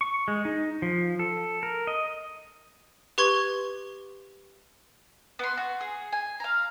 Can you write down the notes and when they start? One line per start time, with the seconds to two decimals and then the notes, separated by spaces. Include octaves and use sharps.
0.01 C#6
0.28 G#3
0.45 D#4
0.82 F3
1.19 A4
1.63 A#4
1.87 D#5
3.18 G4 B4 C6 C#6 G#6 G7
5.39 B3 C6
5.57 F#4
5.81 G#4
6.13 G#5
6.40 F5 A#5